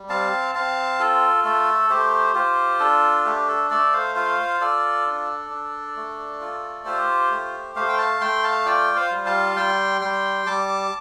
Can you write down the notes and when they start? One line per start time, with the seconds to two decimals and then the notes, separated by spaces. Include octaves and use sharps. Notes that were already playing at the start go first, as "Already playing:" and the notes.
Already playing: G3
0.09 C4 F5 A5
0.55 C4 F5 A5
1.00 F4 A4
1.44 A3 A4
1.90 A3 G4 C5
2.35 F4 G4 C5
2.80 D4 A4
3.25 A3 G4
3.48 A4
3.70 A3 A4 D5
3.94 C5 F5
4.15 F4 C5 F5
4.61 F4 A4 D5
5.06 D4
5.50 D4
5.96 A3
6.41 F4
6.85 F4 G4 C5
7.31 A3
7.76 A3 C5 F5
7.89 G5
7.98 F5 A5
8.21 A3 G5 C6
8.44 F5 A5
8.66 F4 D5 G5
8.96 C5 F5
9.12 G3
9.26 F5 A5
9.56 G3 G5 C6
10.01 G3 G5 C6
10.47 G3 A5 D6